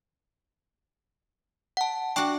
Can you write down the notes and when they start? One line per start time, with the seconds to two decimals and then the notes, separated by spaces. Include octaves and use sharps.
1.77 F#5 A5
2.16 D4 F#4 G5 C#6